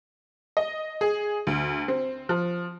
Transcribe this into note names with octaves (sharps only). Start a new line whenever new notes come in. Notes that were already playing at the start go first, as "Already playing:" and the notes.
D#5
G#4
D2
C4
F3